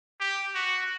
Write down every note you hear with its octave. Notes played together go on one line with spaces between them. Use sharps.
G4
F#4